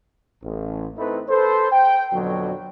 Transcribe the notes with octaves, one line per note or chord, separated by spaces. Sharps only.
A1
A3 C4 D#4 E4 B4
A4 B4 C5
G5
F2 B2 D3 F#3